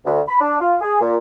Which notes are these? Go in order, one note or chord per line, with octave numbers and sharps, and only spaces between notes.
D2
B5
D4
F4
G#4
A#2